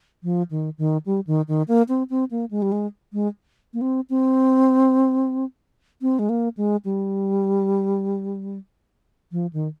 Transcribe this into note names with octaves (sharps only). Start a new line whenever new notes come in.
F3
D#3
D#3
G3
D#3
D#3
A#3
C4
C4
A#3
G#3
G3
G#3
G#3
A#3
C4
C4
C4
G#3
A#3
G#3
G3
F3
D#3